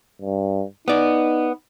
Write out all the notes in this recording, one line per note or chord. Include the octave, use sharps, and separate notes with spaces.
G2
B3 D#4 D5